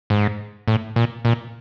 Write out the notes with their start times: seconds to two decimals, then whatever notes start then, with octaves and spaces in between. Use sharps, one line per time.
0.10 G#2
0.68 A2
0.96 A#2
1.25 A#2